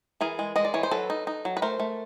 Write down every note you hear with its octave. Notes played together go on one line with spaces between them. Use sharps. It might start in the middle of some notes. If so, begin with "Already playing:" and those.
E3 G#4 A#4
G#3
G#3 D#5
D5
E3 C#5
C5
F#3 A4 B4
D#4
D#4
F#3
B4
A3 A#4 C5
A3